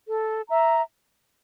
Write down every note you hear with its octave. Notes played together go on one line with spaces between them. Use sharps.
A4
E5 A#5